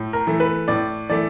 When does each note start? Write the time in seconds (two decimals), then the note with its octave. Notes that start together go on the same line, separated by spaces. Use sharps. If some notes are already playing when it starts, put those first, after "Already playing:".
Already playing: A2
0.13 A#4
0.27 E3 A3
0.40 B4
0.68 A2 D5
1.10 E3 A3 D5